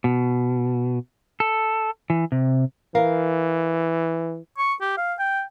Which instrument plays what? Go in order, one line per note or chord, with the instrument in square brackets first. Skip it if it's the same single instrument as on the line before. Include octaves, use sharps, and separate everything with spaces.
[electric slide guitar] B2
A4
E3
C3
[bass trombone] E3 [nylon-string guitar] A#4 F5
[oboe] C#6
G4
F5
G5